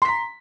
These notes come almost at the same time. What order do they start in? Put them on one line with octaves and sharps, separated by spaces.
C6 B6 A#5